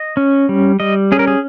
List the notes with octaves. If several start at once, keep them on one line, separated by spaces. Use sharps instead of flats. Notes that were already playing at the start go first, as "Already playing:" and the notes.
Already playing: D#5
C#4
G3
G3 D#5
C#4 G#4
A#4
G#4